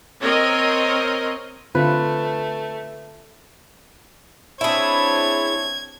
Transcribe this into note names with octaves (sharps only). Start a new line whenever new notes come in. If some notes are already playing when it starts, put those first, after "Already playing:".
C4 A#4 C#5 D#5
D3 A3 C4 F4 B4
C4 D4 E4 G#4 C#5 A5 G#6